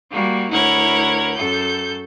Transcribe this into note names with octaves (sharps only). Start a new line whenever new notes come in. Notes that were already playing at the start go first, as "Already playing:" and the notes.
G3 A#3 F#4
D2 E4 A#4 C#5 F#5 G#6
F#2 A4 G6